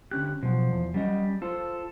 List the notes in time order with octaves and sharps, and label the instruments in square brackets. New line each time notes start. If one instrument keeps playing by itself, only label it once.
[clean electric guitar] D3 C#4 G4 [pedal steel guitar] F#6
[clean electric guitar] B2 F#3 [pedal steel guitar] F3
[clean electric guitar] E2
[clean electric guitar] F#3 C#4 D#5 [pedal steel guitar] G3
[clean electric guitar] F4 C5 [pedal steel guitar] A4